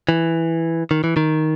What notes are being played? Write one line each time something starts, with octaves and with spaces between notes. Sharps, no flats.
E3
D#3
E3
D#3